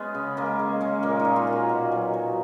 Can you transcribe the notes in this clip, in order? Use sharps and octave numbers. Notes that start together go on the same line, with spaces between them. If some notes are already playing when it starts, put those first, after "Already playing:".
Already playing: G#3 B3 C#4
C#3
G#3 A#3
G#3
G#3 C#4
A#2 A#3
D#4
A#2
F4
A#2
F#4
B2
F#3
F#3